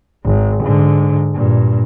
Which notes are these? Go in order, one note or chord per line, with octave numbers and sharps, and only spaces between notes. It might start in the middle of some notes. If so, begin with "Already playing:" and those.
G#1
G#2 D3
G2 A#2